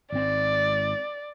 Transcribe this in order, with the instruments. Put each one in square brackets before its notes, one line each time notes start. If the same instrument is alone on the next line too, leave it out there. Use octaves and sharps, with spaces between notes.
[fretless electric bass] G#1 C4 [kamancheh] D5